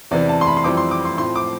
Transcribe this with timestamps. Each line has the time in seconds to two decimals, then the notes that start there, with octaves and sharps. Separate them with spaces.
0.11 E2 C3 E3 D5
0.29 A5
0.41 C6
0.47 B5
0.57 C6
0.64 F2 E3 G3 C4 E4 D6
0.77 C6
0.91 D6
1.05 C6
1.17 A2 F3 C4 C6
1.35 D6